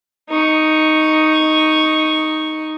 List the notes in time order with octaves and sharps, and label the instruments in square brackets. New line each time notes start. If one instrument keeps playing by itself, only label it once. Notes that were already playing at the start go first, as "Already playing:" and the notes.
[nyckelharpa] D#4 C#6